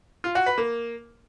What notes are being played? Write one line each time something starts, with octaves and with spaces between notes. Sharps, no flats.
F4
F#4
B4
A#3